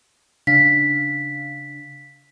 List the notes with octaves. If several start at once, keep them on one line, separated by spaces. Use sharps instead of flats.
C#3 D4 F5 B6